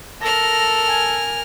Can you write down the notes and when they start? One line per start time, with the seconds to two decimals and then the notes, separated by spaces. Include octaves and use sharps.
0.21 A4 A#4 F6 A#6
0.87 G#5